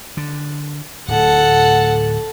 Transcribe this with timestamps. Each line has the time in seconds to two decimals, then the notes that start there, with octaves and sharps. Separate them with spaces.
0.17 D3
1.08 D1 A2 A4 F#5